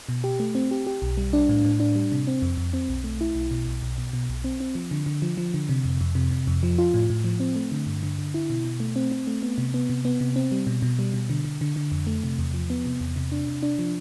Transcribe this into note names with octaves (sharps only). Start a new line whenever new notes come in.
B2
G4
A3
C4
G4
G4
B1
G3
D4
A2
A2
D4
G3
C3
C4
F2
F2
C4
B1
A3
E4
B1
B2
B1
B1
B2
B2
B1
C4
C4
F3
D3
D3
F3
F3
D3
C3
F2
F2
C3
C3
F2
F3
F4
A2
A2
F3
C4
A3
D3
G2
D3
D3
E4
B2
B2
A3
C4
C4
A3
B3
C3
B3
C3
B3
C3
C4
G3
B2
B2
G3
B2
D3
D3
D3
D3
F2
A3
C3
E2
F3
B3
C3
E2
C3
D4
C3
D4
F3